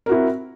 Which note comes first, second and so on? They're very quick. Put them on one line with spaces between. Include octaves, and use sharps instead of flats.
A#4 F#4 E4 C4